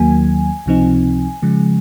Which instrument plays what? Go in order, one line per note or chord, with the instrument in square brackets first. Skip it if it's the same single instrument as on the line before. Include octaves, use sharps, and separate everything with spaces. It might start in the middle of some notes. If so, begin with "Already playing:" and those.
Already playing: [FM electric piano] D#2 D#3 F#3 A#3 G#5
C#2 C3 F3 C4 D#4
C#3 F3 G#3